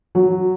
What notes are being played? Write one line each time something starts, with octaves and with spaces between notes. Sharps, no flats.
F#3